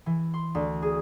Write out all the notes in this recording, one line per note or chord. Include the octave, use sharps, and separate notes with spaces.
E3
C6
D2
G#4